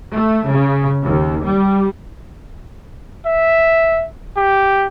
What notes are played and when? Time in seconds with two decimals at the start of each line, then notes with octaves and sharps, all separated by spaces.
0.15 A3
0.48 C#3
1.03 D#2
1.44 G3
3.26 E5
4.37 G4